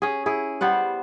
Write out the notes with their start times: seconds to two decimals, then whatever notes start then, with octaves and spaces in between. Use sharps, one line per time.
0.02 C#4 G#4
0.26 E4 G#4
0.61 G3 B3 C5 F#5